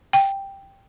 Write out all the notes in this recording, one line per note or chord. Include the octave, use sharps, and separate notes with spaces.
G5